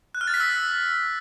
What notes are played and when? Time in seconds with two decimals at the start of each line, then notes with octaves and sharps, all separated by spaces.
0.15 F#6
0.21 F6
0.27 A6
0.34 B6
0.40 E6